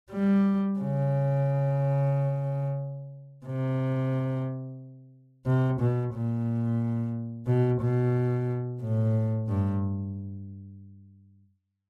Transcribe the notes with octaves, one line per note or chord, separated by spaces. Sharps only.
G3
C#3
C3
C3
B2
A#2
B2
B2
A2
G2